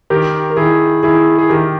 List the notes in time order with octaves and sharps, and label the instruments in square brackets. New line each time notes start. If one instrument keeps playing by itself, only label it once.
[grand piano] D#3 [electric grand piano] G4 A#4
[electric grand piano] A#4
[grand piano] D#3 [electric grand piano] E4 G#4
[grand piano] D#3 [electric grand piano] E4 G#4
[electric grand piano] G#4
[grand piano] D#3 [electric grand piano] G4 A#4